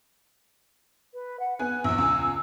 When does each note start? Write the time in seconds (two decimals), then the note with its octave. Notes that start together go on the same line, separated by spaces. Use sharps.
1.14 B4
1.40 F#5
1.59 B3 G#5 F#6
1.84 A#1 E2 E6
1.98 C#2 G#5